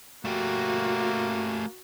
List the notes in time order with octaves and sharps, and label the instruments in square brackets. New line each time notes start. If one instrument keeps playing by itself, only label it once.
[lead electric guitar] A3 G4 [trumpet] A#3 [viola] F#4